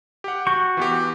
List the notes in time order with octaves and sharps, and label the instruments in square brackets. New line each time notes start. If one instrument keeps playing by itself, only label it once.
[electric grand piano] G4 F#5
[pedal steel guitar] F#4 C#6 [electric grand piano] G6
[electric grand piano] E3 B3 G4